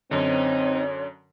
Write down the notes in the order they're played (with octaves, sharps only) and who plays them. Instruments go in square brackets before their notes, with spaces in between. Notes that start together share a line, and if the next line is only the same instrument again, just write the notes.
[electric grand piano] F#2 D3 [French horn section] C4 [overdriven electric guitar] D#4 [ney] C#5